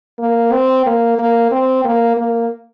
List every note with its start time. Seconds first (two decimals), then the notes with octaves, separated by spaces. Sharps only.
0.19 A#3
0.52 C4
0.86 A#3
1.19 A#3
1.51 C4
1.85 A#3
2.17 A#3